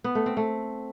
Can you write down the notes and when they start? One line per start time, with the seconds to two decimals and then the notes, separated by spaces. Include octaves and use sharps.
0.04 B3
0.15 A3
0.26 C4
0.37 A3